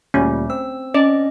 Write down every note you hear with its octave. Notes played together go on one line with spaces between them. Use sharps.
D2 A#2 G3 A3 C#4
C4 E6
C#4 D5 D#5